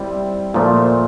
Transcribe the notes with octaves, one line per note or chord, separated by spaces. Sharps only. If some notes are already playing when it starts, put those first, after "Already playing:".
Already playing: G3 C4 E4
A#2 F3 A3